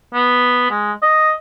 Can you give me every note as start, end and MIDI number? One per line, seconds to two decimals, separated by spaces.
0.14 0.66 59
0.70 0.92 56
1.02 1.32 75